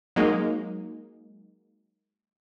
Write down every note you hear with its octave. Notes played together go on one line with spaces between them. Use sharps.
F#3 G#3 A#3 D#4